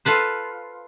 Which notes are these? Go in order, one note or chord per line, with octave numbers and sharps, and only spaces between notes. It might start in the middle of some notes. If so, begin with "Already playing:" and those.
F4 A4 B4 C5